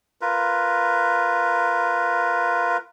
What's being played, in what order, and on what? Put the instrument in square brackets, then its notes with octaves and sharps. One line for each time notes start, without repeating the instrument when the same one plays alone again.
[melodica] F4 A#4 B4